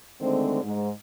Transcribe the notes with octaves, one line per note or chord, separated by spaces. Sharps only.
D3 D#3 G#3 A3 C4
G#2